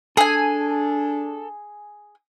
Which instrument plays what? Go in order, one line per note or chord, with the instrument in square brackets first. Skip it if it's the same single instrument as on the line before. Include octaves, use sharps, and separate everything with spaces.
[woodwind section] D4 [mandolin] G#4 G#5 [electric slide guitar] A4